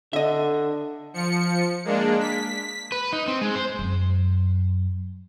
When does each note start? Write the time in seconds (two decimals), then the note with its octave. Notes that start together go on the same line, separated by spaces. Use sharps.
0.13 D3 D#5 E5
1.14 F3 C#7
1.85 G#3 A#3 D4
2.20 B6
2.92 B4
3.13 D#4
3.28 C4
3.41 G#3
3.55 C5
3.79 F#2